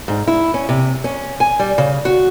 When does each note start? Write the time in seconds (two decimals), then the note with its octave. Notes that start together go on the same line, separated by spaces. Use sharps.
0.08 G#2
0.28 E4
0.54 C#4
0.69 C3
1.04 C#4
1.40 G#5
1.59 G3
1.78 C#3
2.05 F#4